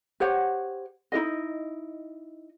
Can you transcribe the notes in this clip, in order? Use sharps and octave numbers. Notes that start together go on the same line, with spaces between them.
G4 C5 C#5 F#5
D#4 E4 G#4 D#5